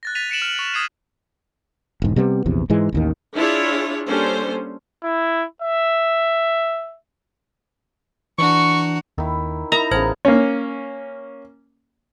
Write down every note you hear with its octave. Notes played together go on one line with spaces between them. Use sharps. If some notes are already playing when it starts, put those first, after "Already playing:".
F#6 A6 A#6
A6 B6 D#7 F7
A6 C#7 D7 E7 F#7
F6 F#7
C#6 F7 F#7
D#6 G#6 C7 D#7
E1 G#2
C3 G3 A3 B3
A#1 E2 C3
G#2 E3 G#3
A1 D#2 D#3
D4 E4 F4 G#4 C#5
G3 A#3 C#4 D4 A4 C5
E4
E5
E3 D4 F#4 A#5 C#6
D#2 D#3 E4
D#4 E4 A#4 A#5
A1 C#3 B3 C5 A5 G#6
A#3 C#4